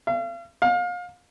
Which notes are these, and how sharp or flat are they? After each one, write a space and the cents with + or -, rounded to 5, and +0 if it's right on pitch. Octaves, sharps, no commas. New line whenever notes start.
F5 -40
F5 +30